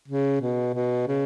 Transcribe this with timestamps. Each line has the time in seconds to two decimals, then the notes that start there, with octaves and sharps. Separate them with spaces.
0.08 C#3
0.41 B2
0.74 B2
1.08 C#3